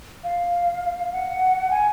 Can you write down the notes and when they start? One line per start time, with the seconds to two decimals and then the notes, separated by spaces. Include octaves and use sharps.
0.24 F5
1.12 F#5
1.71 G#5